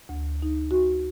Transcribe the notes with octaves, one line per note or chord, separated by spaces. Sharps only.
D2
D#4
F#4